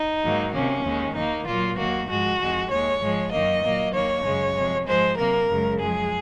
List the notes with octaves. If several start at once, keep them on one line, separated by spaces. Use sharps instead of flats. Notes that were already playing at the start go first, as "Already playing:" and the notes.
Already playing: D#4
G#2 D#3 F#3 A#3
C3 D#3 A#3 C#4
D#2 D#3 G#3
D#2 D#3 A#3 D#4
A#2 F#3 A#3 F4
D#2 D#3 F#3 A#3 F#4
G#2 F3 G#3 F#4
F2 D#3 G#3
D#2 D#3 G#3 C#5
G#2 F3 G#3
F#2 D#3 F#3 A#3 D#5
A#2 F#3 A#3
D#2 D#3 A#3 C#5
F#2 C#3 G#3
C3 F3 G#3
G#2 F3 G#3 C5
C3 F#3 A#3 A#4
F#2 C#3 G#3
F#2 F3 G#3 G#4